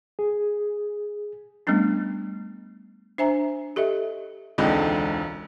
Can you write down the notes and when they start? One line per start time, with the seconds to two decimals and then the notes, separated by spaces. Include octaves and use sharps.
0.19 G#4
1.67 G3 A3 B3 C#4 D4
3.18 D4 C5 E5 G#5 A#5
3.76 G4 A4 D#5 E5
4.58 E1 C#2 D3 C4 D#4